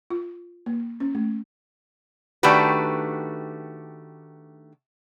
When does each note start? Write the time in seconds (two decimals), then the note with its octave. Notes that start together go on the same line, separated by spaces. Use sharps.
0.10 F4
0.66 A#3
1.00 C#4
1.15 A3
2.43 D#3 A3 D4 F#4 G4 B4